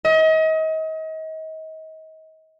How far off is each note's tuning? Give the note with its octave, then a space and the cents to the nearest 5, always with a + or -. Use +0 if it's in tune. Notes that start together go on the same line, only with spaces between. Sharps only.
D#5 +35